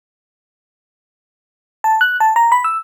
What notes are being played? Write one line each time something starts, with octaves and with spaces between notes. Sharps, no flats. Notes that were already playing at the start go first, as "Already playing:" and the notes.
A5
F#6
A5
A#5
B5
E6